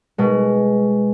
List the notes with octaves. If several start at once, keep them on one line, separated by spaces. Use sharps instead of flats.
B2 G#3